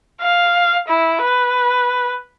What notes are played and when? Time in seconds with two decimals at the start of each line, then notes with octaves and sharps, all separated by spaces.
0.21 F5
0.88 E4
1.22 B4